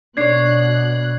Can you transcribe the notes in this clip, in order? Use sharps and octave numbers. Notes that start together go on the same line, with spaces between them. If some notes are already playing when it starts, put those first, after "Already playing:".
B2 D4 C#5 F#6 G#6 C7